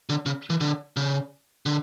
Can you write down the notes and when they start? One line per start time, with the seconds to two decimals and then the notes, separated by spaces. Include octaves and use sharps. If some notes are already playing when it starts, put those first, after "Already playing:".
0.09 D3
0.26 C#3
0.50 E3
0.61 D3
0.97 C#3
1.66 D3